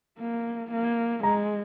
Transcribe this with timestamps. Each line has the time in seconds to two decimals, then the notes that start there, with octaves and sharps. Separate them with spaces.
0.20 A#3
0.71 A#3
1.23 G#3 A#5